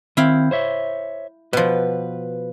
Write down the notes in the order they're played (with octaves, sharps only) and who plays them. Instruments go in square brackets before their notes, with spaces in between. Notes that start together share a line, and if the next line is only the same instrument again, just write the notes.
[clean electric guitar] D#3 C4 [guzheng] E4 F5 G5
[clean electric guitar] C5 C#5 E5
[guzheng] B2 F3 [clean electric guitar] B4